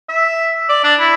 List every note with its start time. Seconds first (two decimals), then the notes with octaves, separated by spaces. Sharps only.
0.09 E5
0.69 D5
0.84 D4
1.00 E4